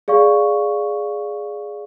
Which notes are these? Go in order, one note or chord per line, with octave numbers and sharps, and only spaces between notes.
G#4 D5 F5 C#6